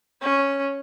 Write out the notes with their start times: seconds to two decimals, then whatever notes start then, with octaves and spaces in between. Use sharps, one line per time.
0.22 C#4